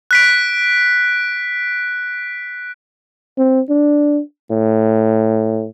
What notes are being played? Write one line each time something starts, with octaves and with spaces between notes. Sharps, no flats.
F#6 B6 D7
C4
D4
A2